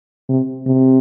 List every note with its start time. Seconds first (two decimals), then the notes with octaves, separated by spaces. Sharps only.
0.29 C3
0.66 C3